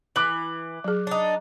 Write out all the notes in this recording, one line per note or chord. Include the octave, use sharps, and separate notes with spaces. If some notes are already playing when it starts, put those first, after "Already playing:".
E3 D6 F#6 F#7
F#3 G#4
D4 D#4